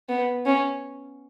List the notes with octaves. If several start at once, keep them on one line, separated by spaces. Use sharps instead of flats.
B3
C#4